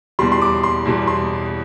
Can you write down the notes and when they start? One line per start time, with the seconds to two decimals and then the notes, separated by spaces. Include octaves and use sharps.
0.19 E2 B2 G3 C6
0.32 C6
0.42 D6
0.64 C6
0.85 E2 B2 G3
1.07 C6